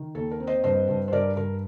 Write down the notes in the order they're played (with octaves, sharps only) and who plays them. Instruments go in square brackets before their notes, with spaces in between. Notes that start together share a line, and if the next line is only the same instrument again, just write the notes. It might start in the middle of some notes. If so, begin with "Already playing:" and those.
Already playing: [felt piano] D#3
D#2 A4
A#4
C4
C5 D#5
G2 C5 D#5
G2
C5
G2 A#4 D5
G2 A#4